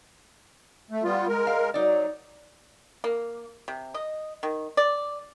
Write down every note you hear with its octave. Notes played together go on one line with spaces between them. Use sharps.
A3
G3 B3 F4
G#3 A#4
F5
F#3 D#4 D5
A#3
C3
D#5
D#3
D5